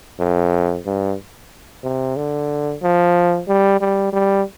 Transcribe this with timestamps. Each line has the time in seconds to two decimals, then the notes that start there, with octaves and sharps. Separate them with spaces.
0.19 F2
0.86 G2
1.83 C3
2.16 D3
2.82 F3
3.48 G3
3.80 G3
4.13 G3